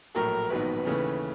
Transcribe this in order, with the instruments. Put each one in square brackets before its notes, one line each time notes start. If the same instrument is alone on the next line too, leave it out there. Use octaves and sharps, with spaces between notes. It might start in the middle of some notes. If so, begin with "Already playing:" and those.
[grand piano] A#1 A2 F#3 A3 [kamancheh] A#4
[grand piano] A#1 G#2 D#3 F#3 B3 [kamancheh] B4
[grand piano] D#2 C#3 E3 A3 C#4